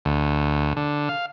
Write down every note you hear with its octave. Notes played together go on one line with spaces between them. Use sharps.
D2
D3
F5